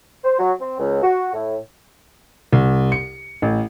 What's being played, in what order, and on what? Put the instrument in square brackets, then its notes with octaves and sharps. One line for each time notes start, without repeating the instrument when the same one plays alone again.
[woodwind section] C5
F#3
C4
C#2
F#4
A2
[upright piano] C2
C#7
A1